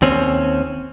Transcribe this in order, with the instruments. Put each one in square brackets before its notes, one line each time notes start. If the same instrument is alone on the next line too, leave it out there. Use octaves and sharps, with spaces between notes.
[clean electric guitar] D#2 C4 C#4